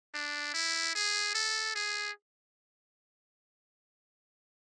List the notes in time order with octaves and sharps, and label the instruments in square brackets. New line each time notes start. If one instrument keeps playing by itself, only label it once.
[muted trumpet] D4
E4
G#4
A4
G#4